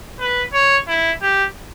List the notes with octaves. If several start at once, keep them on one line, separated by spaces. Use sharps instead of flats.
B4
C#5
E4
G4